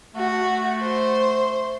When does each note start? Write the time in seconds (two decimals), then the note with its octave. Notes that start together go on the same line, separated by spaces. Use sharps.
0.15 A3 F#4
0.82 C5